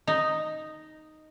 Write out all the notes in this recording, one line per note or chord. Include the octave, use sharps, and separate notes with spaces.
D#4